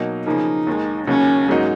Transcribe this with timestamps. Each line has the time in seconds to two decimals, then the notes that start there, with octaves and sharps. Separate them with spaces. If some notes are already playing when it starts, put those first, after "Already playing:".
Already playing: B2 F#3 A#3 D#4
0.26 C#3 F3 A#3 D#4
0.67 D#2 D#3 G#3
1.07 D#2 C#3 F#3 A#3 C#4
1.48 G#2 F#3 A#3 D#4 F#4